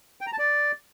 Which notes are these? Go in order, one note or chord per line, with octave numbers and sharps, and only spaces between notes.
G5
A#5
A5
D5